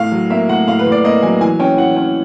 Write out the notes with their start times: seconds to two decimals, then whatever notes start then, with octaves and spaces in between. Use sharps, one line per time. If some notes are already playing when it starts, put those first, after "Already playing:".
Already playing: A2 F5
0.12 F#3
0.30 A#3 E5
0.49 A2 F#5
0.68 A2 F5
0.79 B4
0.86 A2
0.92 D5
1.04 A#3 D#5
1.23 F#3 G#5
1.41 E3 G#5
1.60 C#4 G5
1.78 E3 F#5
1.96 C#4